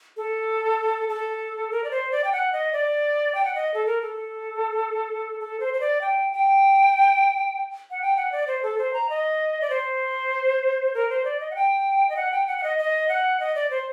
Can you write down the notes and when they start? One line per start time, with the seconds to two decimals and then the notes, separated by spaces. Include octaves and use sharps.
0.17 A4
1.09 A4
1.71 A#4
1.84 D5
1.91 C5
2.12 D5
2.24 G5
2.32 F#5
2.53 D#5
2.73 D5
3.35 G5
3.45 F#5
3.55 D#5
3.74 A4
3.86 A#4
4.02 A4
5.41 A4
5.60 C5
5.74 C5
5.81 D5
6.01 G5
6.33 G5
7.91 F#5
8.02 G5
8.17 F#5
8.32 D5
8.47 C5
8.63 A4
8.78 C5
8.94 A#5
9.10 D#5
9.61 D5
9.70 C5
10.94 A#4
11.10 C5
11.25 D5
11.40 D#5
11.51 F#5
11.55 G5
12.09 D#5
12.17 F#5
12.32 G5
12.47 F#5
12.58 F#5
12.63 D#5
12.79 D#5
13.08 F#5
13.40 D#5
13.55 D5
13.70 C5